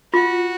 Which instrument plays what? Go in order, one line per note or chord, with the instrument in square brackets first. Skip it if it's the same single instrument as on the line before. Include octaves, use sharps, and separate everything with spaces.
[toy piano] F4 [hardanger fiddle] F#4